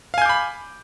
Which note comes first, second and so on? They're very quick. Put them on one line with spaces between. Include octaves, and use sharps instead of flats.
F5 G#5 G6 D6 B5